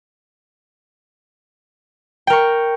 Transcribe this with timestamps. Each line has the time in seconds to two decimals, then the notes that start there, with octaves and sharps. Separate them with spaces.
2.27 G5
2.30 A#4
2.33 C#6